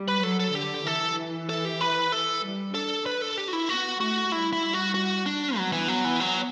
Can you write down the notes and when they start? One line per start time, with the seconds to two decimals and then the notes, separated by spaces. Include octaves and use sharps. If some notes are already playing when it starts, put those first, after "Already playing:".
Already playing: G3
0.08 B4
0.24 F#3 A4
0.40 A4
0.55 D3 G4
0.87 E3 A4
1.49 A4
1.65 G4
1.81 B4
2.12 A4
2.44 G3
2.74 D4 A4
3.06 B4
3.22 A4
3.37 G4
3.48 F#4
3.53 E4
3.69 B3 F#4
4.01 A3 F#4
4.32 G3 E4
4.53 E4
4.74 F#4
4.94 F#4
5.26 D4
5.57 F#3 B3
5.72 E3
5.88 F#3
6.05 E3
6.20 F#3